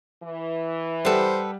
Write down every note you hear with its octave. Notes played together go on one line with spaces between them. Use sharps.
E3
G3 G4 A4 B4 C5 F#5